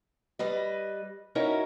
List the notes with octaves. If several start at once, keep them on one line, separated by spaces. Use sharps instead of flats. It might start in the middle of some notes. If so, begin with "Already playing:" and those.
G3 B4 D#5
C#4 D#4 E4 F#4 A#4 C#5